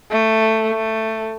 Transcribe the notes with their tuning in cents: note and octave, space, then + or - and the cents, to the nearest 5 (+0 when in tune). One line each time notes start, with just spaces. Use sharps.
A3 +10
A3 +10